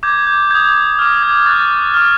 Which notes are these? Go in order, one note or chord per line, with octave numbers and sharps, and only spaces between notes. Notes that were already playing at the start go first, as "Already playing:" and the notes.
D6 G6 G#6
G6
D#6 G6 G#6
D6 F6
G#6
C#6 F#6 A6
D6 F6